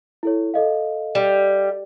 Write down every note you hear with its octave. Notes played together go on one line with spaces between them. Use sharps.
E4 A4 C#5
A4 D#5 F5
G3